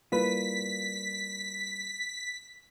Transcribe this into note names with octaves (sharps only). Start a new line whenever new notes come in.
G3 A#3 E4 F4 B4 B6